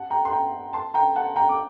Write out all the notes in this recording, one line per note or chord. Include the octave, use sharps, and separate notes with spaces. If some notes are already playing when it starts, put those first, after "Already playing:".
Already playing: F#5 A5
G5 A#5
C6
G5 A#5
A5 C6
G5 A#5
F#5 A5
G5 A#5
D6